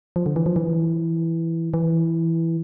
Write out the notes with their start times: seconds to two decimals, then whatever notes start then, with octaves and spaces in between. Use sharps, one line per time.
0.16 F3
0.26 D3
0.36 E3
0.46 F3
0.56 E3
1.74 E3